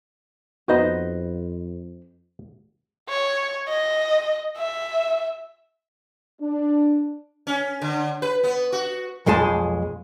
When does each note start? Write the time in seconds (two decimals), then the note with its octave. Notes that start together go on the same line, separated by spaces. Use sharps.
0.68 F2 B3 D#4 F#4 B4 C5 D#5
3.09 C#5
3.68 D#5
4.58 E5
6.40 D4
7.47 C#4
7.82 D3
8.22 B4
8.44 B3
8.72 F#4
9.26 B1 F2 G#3 G#4 A5